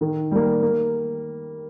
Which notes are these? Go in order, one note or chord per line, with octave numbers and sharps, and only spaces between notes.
D#3
G3 A#3
A#3